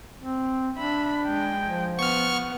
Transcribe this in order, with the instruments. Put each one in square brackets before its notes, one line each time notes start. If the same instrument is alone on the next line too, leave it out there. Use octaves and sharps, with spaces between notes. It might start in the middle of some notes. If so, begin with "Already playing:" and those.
[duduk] C4
[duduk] D4 [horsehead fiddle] E5 B5
[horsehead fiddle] G#3 G5
[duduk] F3
[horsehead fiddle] B3 F#5 [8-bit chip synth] C#6 F6